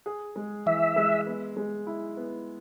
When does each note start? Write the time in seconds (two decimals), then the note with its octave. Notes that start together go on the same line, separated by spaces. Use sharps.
0.06 G#4
0.36 G#3
0.66 E3 E5
0.96 G#3
1.26 B3
1.57 G#3
1.87 E4
2.17 B3